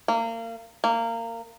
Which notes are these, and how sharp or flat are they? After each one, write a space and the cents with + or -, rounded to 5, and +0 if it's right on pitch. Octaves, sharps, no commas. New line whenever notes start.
A#3 -30
A#3 -25